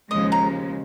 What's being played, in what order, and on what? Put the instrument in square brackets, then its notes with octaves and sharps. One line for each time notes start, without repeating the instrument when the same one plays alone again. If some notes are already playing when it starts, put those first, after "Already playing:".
[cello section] D#2 C#3 F3 G#3 [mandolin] D#5
[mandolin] A#5